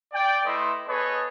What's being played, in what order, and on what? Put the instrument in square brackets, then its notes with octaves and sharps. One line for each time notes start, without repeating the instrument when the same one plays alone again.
[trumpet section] D5 G5
A3 E4 B4 D#5 C6
B3 G#4 A4 B4 C#5 D#5